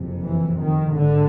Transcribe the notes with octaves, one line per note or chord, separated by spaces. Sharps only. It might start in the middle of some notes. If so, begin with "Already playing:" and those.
Already playing: F#1 F2 C3
E3
D#3
G#1 G#2 D3